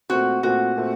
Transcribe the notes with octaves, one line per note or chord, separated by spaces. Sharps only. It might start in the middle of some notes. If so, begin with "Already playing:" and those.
A#2 A3 C4 F#4
A#2 A3 C4 F#4
A#2 A3 C4